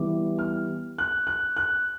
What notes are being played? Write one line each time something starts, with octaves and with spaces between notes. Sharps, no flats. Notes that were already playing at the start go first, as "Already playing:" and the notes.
Already playing: E3 G3 B3 D6
F6
F#6
F#6
F#6